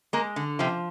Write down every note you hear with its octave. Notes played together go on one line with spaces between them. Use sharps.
G#3 A#3
D3
C3 F3 C4